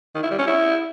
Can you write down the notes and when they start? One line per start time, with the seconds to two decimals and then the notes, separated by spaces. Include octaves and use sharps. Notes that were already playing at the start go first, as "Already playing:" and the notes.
0.15 D#3
0.23 E4
0.31 G3
0.39 C#4
0.47 E4